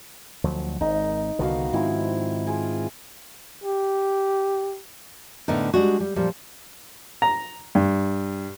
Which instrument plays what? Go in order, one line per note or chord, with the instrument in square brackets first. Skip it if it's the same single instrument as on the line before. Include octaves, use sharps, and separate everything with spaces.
[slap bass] D2 F3 F#3
[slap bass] G#1 [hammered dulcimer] D#4
[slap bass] C2 D3 D#3 [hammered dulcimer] B3 F#4 F5
[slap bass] G#2 D#3 [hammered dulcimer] F3 C4 E4
[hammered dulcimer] E4 F4 G#4
[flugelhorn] G4
[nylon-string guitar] A2 D3 B3 D#4 A#4
G3 G#3 C#4 D4 F#4
G3
A#2 F3 G3
[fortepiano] A#5
G2